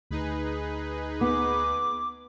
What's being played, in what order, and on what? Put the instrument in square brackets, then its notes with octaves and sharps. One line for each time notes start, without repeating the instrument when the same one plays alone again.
[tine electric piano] D2 [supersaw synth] D#4 G#4 B4
[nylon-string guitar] B3 [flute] D6